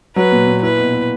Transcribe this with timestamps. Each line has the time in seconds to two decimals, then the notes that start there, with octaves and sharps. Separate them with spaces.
0.15 F#3 B4
0.32 A#2
0.47 A#2
0.62 E4 B4
0.79 B2
0.93 E4